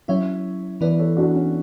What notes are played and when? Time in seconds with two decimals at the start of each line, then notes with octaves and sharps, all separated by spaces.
0.08 F#3 C#4 E4 C#5 E5
0.81 E3 B3 E4 B4 D5
0.99 A4 C#5
1.17 D4 F#4
1.35 C#4